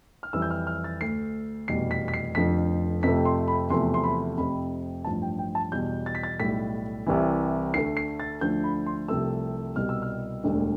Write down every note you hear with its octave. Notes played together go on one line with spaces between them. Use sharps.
F6
F2 E3 G3 E6
G6
F6
F6
A6
D2 D3 A3 C7
F1 E2 B2 G3 C7
B6
B6
C7
F1 F2 D3 F3 B6
F2 C3 F3 A3 B6
C6
B5
E2 C3 F3 A3 C6
C6
B5
F1 F2 C3 B5
A1 G2 F3 A5
G5
G5
A5
E2 B2 G3 G6
A6
B6
A6
B1 A2 G3 B6
C2 C3 E3
D2 D3 A3 C7
C7
A6
D2 D3 F3 A3 G6
B5
C6
C2 C3 F3 A3 E6
C2 B2 G3 F6
E6
F6
E1 D2 D3 G3